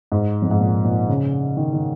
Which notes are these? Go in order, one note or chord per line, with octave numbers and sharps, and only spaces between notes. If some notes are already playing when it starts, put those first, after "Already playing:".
G#2
F2
G#2
A#2
A#2
C#3
D#3
D#3